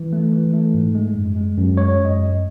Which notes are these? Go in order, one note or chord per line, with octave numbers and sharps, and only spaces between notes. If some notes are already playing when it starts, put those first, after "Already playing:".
Already playing: E3
A3
E3
A3
G#2
G#3
F#2
G#3
F#2
G#3 C#5
F#2
D#5
F#2